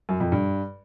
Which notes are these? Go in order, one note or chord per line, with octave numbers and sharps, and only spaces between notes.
F#2
F2
G2